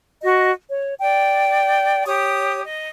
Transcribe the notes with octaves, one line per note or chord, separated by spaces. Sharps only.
F#4 D#5
C#5
D5 G5
G4 C#5 D#6
D#5